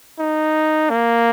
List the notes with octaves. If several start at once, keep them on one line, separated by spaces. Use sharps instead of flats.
D#4
A#3